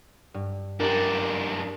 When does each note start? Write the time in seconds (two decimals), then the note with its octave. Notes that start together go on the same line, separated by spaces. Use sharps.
0.34 G2
0.80 F#2 D4 G4 A#4